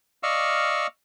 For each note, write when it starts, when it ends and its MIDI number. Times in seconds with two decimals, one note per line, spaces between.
0.23 0.87 74
0.23 0.87 75
0.23 0.87 77
0.23 0.87 85
0.23 0.87 88
0.23 0.87 89